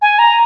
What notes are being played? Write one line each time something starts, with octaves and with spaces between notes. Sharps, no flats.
G#5
A#5